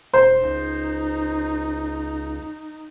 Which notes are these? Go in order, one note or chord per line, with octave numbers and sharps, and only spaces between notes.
E1 C5
C#2 D#4